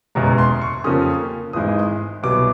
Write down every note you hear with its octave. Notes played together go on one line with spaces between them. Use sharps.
F#1 E2 B2 G#3 A#5
C6
C#6
F2 C#3 F3 A#3 C#4 D#6
G#1 G#2 E3 G#3 D#6
C2 B2 F#3 B3 D6